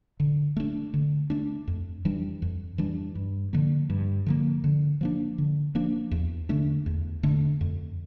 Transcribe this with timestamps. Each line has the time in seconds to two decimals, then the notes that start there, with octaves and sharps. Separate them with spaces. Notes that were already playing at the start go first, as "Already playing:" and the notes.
0.20 D3
0.57 A3 D4
0.94 D3
1.30 A3 D4
1.68 F2
2.05 E3 G3 D4
2.42 F2
2.78 E3 G3 D4
3.15 G2
3.53 D3 F3 A#3
3.90 G2
4.27 D3 F3 A#3
4.64 D3
5.01 F3 A#3 D4
5.38 D3
5.75 F3 A#3 D4
6.11 E2
6.49 D3 A3 D4
6.86 E2
7.23 D3 A3 D4
7.61 F2